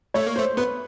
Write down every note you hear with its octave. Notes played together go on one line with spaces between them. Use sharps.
A3 C#5
A#3
A3 C5
B3 B4